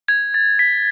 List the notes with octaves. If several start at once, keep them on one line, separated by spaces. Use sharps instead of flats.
G#6
A6
B6